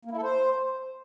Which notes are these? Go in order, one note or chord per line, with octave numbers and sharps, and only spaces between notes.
A#3
E4
A4
C5